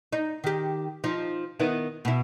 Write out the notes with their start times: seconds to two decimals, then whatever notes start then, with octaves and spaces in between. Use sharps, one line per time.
0.13 D#4
0.44 D#3 G4
1.04 F3 D#4
1.60 D#3 B3 E4
2.05 B2 E4